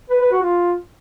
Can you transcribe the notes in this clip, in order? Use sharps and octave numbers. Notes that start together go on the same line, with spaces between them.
B4
B4
F#4
F4